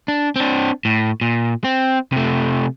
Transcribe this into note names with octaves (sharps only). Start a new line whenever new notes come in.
D4
C4 D4
A2
A#2
C4
C3 A3